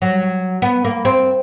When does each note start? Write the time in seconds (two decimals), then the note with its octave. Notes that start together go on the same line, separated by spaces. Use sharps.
0.02 F#3
0.62 B3
0.85 A#3
1.05 C4